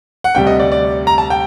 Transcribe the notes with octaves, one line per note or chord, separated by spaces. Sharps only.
F#5
D2 C3 G3 G5
D#5
D5
D5
A#5
A5
G5